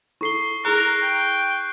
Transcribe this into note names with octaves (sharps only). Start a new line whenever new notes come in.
E4 A4 C#6 C7 G7
E4 G#4 A#4 A#5 F#6
G5